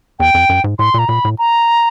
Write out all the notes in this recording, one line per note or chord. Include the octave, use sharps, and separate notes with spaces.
E2 G5
F2
F#2
G#2
A2 C6
A#2 A#5
A#2 B5
A2
A#5